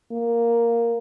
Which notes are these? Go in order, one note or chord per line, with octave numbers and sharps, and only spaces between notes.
A#3